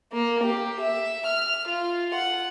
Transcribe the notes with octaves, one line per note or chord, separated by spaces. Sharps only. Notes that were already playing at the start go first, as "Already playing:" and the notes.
A#3
G4
E5
F6
F4
F#5